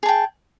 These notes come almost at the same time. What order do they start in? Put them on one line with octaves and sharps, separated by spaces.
G#4 A5 G5